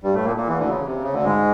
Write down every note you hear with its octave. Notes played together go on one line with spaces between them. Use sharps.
G2 G3
A2 A3
A#2 A#3
A#2 A#3
E2 E3
D2 D3
C#3
C3
C#3
D2 D3
G#2 G#3